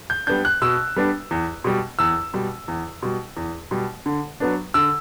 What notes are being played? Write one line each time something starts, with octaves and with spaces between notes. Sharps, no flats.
G6
G3 B3 D4 G6
F#6
B2 E6
G3 B3 D4
E2
B2 G3
E2 E6
B2 G3
E2
B2 G3
E2
B2 G3
D3
F#3 B3 D4
D3 E6